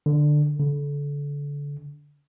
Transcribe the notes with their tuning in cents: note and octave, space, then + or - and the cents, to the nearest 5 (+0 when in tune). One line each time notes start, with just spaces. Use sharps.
D3 +15
D3 -30